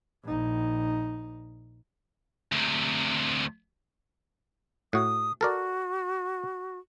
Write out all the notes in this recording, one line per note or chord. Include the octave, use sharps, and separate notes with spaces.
A#1 D#4
D2 C3
A2 F#4 D#6
F#4 A4 A#4 D5